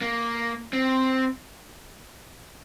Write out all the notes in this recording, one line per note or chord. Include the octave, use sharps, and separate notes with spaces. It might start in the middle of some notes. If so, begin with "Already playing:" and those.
A#3
C4